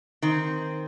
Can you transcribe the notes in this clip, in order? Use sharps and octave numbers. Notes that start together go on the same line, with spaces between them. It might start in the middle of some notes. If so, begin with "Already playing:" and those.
D#3 C4